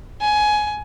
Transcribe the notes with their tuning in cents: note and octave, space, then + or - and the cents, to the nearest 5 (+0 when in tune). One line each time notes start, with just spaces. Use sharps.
G#5 +15